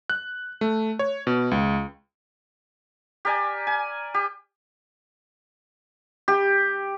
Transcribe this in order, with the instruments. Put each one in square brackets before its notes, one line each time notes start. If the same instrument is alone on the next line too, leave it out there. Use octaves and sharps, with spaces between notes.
[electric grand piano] F#6
A3
C#5
B2
C#2
[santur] G4 A#4 D5 G#5
G#5
G4
[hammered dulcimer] G4